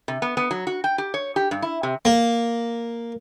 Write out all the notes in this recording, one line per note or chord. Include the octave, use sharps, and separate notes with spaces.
C3
B3
B3
F#3
F#4
G5
G4
C#5
G4
G2
E4
C3
A#3